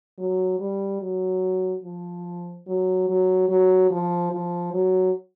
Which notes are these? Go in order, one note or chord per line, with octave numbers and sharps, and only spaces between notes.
F#3
G3
F#3
F3
F#3
F#3
F#3
F3
F3
F#3